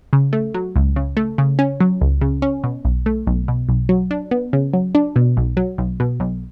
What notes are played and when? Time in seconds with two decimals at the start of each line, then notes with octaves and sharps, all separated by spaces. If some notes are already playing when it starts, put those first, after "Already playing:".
0.13 C#3
0.33 A3
0.54 F#3
0.76 C#2
0.96 C#3
1.17 A3
1.38 C#3
1.59 C#4
1.80 F#3
2.01 C#2
2.21 C#3
2.42 C#4
2.64 B2
2.85 B1
3.06 A3
3.27 B1
3.48 B2
3.69 B1
3.89 F#3
4.11 D4
4.31 B3
4.53 C#3
4.73 F#3
4.95 D4
5.16 B2
5.37 B1
5.57 F#3
5.78 B1
6.00 B2
6.20 B1